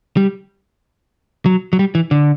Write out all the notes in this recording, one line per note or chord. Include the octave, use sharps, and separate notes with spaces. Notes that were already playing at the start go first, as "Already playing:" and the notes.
G3
F#3
F#3
G3
E3
D3